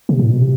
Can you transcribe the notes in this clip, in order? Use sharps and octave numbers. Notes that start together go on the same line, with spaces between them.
C3
A2
B2
C3